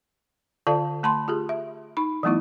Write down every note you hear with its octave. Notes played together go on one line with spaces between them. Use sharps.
D3 F4 A4 D5 F5 A5
A3 A5 B5 C6
F4 G4 G#4
E5
D#4 B5
E3 F#3 A3 B3 D#4 E4